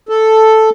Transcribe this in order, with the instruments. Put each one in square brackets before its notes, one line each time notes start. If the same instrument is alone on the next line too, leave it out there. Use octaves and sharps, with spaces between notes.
[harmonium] A4